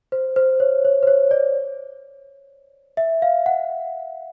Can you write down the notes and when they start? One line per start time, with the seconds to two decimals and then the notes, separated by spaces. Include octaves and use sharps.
0.12 C5
0.36 C5
0.60 C#5
0.85 C#5
1.03 C5
1.07 C#5
1.31 D5
2.97 E5
3.22 F5
3.46 F#5